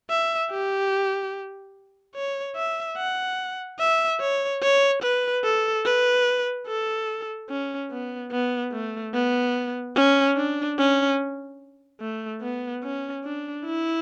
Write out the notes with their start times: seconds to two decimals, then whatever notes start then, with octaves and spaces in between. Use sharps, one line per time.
0.10 E5
0.51 G4
2.15 C#5
2.56 E5
2.97 F#5
3.79 E5
4.21 C#5
4.62 C#5
5.03 B4
5.44 A4
5.85 B4
6.67 A4
7.49 C#4
7.91 B3
8.31 B3
8.72 A3
9.14 B3
9.96 C#4
10.37 D4
10.78 C#4
12.01 A3
12.42 B3
12.83 C#4
13.25 D4
13.66 E4